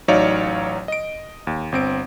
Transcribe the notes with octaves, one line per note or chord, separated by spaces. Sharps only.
A1 F#3 D#4 C#5 D5 F5
D#5 D7
D#2
G1 C4 D7